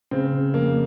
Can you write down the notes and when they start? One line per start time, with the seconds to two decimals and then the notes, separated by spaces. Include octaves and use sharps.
0.11 C#3 C4
0.32 C#3
0.53 F2 A#3